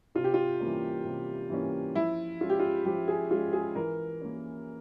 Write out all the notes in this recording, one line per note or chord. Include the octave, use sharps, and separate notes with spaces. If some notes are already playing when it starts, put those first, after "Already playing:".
C3 F4
G4
F4
E3 G3 A#3 C#4
C3
E3 G3 A#3 C#4
F3 E4
G#3 C#4 F4
G4
F4
F3 G4
G#4
G#3 C#4 F4
G#4
E3 A#4
A#3 C#4